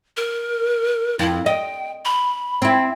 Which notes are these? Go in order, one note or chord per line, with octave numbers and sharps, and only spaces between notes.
A#4
F2 E4
D#5 G5
B5
C4 E4